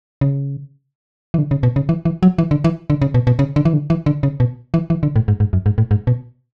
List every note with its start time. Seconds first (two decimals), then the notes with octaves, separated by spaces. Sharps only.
0.21 C#3
1.34 E3
1.38 D3
1.51 C#3
1.63 B2
1.76 C#3
1.89 E3
2.05 E3
2.23 F#3
2.38 E3
2.51 D3
2.64 E3
2.90 D3
3.02 C#3
3.14 B2
3.27 B2
3.39 C#3
3.56 D3
3.65 E3
3.73 D3
3.90 E3
4.06 D3
4.23 C#3
4.40 B2
4.74 E3
4.90 E3
5.03 D3
5.16 A2
5.28 G#2
5.40 G#2
5.53 F#2
5.66 G#2
5.78 A2
5.91 G#2
6.07 B2